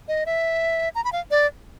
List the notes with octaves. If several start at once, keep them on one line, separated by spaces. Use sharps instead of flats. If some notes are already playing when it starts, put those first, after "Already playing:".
D#5
E5
A#5
B5
F5
D5